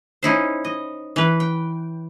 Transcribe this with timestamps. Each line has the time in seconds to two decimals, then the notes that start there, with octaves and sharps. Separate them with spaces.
0.23 C#4 D#4 E4 C5
0.65 D#5
1.16 E3 B4
1.40 G5